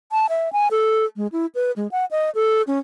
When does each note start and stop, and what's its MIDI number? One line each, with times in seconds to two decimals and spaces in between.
0.12 0.27 81
0.29 0.52 76
0.53 0.68 80
0.71 1.05 69
1.17 1.27 56
1.32 1.46 64
1.55 1.71 71
1.76 1.88 56
1.91 2.05 78
2.11 2.30 75
2.35 2.62 69
2.67 2.79 61